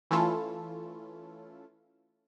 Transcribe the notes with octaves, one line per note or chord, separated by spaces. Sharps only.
E3 A3 C#4 E4 F4 A4